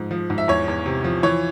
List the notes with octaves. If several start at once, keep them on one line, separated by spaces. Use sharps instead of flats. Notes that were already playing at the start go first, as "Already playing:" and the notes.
Already playing: G#2 F3
F3
G#2
E5
E2 C#5
E2
C3
F3
E3 C#5